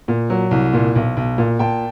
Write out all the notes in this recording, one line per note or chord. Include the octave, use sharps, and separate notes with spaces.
A#2
F#3
C2
A#2
B1
B1
A#2
A#2 G5 A5